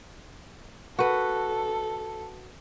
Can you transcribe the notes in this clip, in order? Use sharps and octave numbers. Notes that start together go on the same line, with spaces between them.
F#4 A4 B4